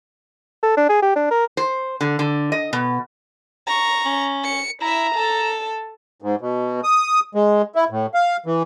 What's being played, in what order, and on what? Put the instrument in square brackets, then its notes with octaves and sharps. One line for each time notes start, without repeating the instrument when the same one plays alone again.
[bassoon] A4
D4
G#4
G4
D4
A#4
[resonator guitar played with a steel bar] C5
D3
D3
D#5
B2
[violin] A#5 C#6
[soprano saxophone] C#4
[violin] C#7
[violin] E4 E5 [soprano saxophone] A#5
[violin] A4 A5
[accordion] G#2
B2
D#6
G#3
E4
A2
F5
E3